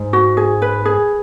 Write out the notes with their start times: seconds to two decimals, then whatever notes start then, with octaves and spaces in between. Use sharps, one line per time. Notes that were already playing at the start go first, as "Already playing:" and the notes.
Already playing: G#2
0.13 F#4
0.37 G#4
0.62 B4
0.85 G#4